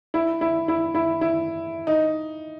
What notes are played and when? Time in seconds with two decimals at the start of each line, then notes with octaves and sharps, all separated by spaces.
0.14 E4
0.41 E4
0.68 E4
0.95 E4
1.21 E4
1.87 D#4